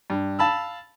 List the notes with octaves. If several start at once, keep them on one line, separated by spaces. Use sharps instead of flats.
G2
F5 A5 B5 E6